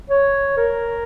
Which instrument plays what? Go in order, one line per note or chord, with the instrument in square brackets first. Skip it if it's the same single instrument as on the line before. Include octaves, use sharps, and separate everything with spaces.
[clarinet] C#5
A#4